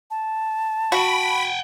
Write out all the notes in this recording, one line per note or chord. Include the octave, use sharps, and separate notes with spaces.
A5
F#4 F#5 G5 B5